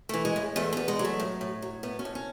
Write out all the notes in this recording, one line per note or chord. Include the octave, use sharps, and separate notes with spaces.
E3 A3
G#3
A2
E2 A3
E2 B3
G#3
F#3
A3
A2
A2
F#3
A2 B3
C#4
A2
C#4